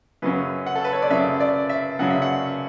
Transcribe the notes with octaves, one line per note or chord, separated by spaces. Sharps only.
F#2 C#3 F#3 C#4 B4
F#5
A4
B4
C#5
D5
F#2 C#3 F#3 C#4 E5
D5
E5
F#2 C#3 F#3 C#4 F#5
E5
F#5